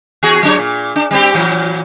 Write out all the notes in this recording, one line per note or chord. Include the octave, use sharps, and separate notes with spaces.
E2 F#4 G#4
F#3 D4 C#5
A#2
D4
G3 C4 G4
A#2 E3 F#3